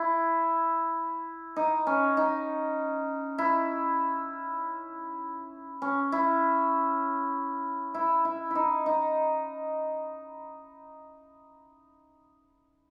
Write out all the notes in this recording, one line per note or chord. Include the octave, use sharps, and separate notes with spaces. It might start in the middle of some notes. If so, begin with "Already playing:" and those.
Already playing: E4
D#4
C#4
D#4
E4
C#4
E4
E4
E4
D#4 E4
D#4